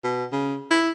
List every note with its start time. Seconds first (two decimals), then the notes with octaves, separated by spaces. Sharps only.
0.04 B2
0.32 C#3
0.71 E4